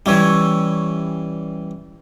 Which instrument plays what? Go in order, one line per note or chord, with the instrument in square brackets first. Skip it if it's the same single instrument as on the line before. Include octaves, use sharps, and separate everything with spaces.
[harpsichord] E3 G3 [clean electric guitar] C#4 E4 C#5